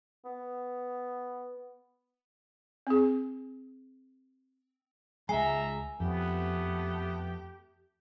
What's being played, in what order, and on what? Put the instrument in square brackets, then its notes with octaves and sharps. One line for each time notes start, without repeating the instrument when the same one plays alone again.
[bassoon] B3
[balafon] C4 G#4
[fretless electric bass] C#2 G#3 [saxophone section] D#4 E5 [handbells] G#5 C7 [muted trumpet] A#5
[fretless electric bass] F2 [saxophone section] A3 G4 [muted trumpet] B3